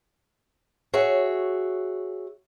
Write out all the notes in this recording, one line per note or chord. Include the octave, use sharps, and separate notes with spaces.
F#4 G#4 C#5 E5